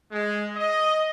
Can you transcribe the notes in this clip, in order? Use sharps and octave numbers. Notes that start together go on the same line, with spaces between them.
G#3
D#5